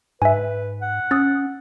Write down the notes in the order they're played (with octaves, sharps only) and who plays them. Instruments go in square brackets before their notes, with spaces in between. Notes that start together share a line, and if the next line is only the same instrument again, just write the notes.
[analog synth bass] G#2 [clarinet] B4 [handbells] E5 G#5
[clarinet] F#5
[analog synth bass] C#4 [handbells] D#6 E6 A6